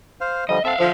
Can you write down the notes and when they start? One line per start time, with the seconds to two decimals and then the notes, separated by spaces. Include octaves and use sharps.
0.21 C5 F5
0.49 D3 F3 G3 D#5
0.65 C4 A4 E5 F5
0.79 D3 F3